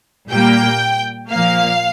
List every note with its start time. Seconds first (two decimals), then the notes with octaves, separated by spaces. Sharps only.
0.30 A#2 G3 A#3 G5
1.30 A#2 F3 A#3 F5